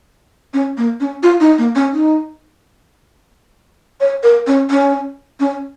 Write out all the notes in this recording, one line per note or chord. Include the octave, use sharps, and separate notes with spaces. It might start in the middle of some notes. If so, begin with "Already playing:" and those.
C#4
A#3
C#4
F4
D#4
A#3
C#4
D#4
C#5
A#4
C#4
C#4
C#4